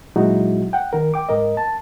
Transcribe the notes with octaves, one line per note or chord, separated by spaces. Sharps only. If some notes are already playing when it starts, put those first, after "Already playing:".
A#2 F#3 G#3 D#4 E4 F#4
F#5 G5
D#3 A#4
G5 D6
G#2 A#4 D#5
A5